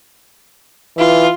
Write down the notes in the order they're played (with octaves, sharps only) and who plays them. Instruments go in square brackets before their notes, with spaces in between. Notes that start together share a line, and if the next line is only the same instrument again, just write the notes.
[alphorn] E3 [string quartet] F4